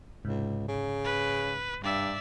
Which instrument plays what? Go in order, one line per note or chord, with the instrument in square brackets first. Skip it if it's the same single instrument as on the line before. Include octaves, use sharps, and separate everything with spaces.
[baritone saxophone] C#2 [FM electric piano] G#2 C3
[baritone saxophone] C#3
[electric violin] B4
[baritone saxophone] G2 [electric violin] D5 E5